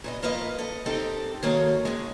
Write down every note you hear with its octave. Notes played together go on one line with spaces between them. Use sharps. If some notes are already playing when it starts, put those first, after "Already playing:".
A#2 B3 D#5
F3 A#3 A#4 B4 D#5
A4 D#5
C4 D#4 G4 A4 A#4
D#3 G#3 A#3 F#4 A4 C#5
G#2 C#3 G#3